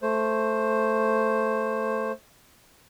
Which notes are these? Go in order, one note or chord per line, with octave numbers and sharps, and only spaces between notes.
A3 C5